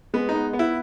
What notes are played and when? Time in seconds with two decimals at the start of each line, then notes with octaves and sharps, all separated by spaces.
0.14 G#3 B3
0.29 D#4
0.34 B3
0.53 B3
0.59 E4